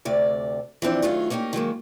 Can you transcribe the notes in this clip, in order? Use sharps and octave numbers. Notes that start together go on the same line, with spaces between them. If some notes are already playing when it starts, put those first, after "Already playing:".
D2 C3 D5
E3 F3 C4 D4
D#3 F#3 A3 F4 G#4
A#3 C#4 D#4 E4 G4
D#3 F#3 G#3 A#3